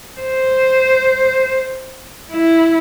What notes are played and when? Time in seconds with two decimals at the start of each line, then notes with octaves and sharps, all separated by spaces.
0.21 C5
2.32 E4